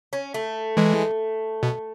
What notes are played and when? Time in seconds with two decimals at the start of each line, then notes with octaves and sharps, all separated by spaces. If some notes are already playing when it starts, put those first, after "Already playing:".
0.13 C#4
0.34 A3
0.77 E3 G#3
1.63 B2